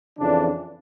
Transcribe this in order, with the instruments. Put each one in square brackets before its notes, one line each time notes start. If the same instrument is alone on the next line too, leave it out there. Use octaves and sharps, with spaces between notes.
[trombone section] F2 C#3 E3 D4